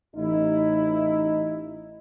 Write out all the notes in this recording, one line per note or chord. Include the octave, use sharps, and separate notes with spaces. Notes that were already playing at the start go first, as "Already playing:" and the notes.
A1 D#4 E4